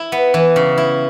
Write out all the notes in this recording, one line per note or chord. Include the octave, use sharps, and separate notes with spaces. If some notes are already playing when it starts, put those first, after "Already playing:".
Already playing: E4
B3
E3
C#3
E4